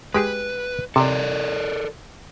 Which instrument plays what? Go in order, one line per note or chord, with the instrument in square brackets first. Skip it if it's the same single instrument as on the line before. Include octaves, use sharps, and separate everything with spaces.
[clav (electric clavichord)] G#3 G4 G#4 [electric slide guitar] B4
[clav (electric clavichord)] C3 [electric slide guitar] A4 A#4 D5